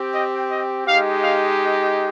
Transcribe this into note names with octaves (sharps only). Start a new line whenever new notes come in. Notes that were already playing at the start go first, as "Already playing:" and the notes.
Already playing: C4 G4
D#5
D#5
G#3 D#4 G4 F5
F5